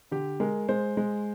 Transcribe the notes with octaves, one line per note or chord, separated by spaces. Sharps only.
D3 G4
G#3 A#4
G#3 C5
G#3